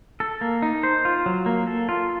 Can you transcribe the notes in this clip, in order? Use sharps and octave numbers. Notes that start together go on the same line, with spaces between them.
A4
A#3
D#4
C5
F4
F#3
A#3
A4
F4